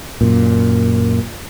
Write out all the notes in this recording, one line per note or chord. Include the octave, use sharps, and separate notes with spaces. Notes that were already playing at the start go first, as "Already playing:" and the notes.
F#2 A#2